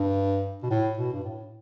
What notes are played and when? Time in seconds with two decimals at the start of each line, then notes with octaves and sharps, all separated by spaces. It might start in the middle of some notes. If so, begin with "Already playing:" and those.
Already playing: G2
0.63 B2
0.70 A2
0.97 B2
1.13 G2
1.24 A2